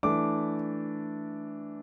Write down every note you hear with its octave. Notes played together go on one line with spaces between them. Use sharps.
E3 A3 D4 D6